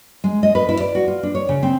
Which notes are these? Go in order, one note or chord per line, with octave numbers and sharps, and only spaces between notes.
G#3
D#5
B4
E4
D5
F#4
F4
D4
C#5
C#3
C4